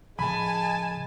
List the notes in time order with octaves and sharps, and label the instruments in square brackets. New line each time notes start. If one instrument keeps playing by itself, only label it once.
[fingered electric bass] A2 C#3 F3 [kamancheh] G#3 A5 [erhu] G#5 [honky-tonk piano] B5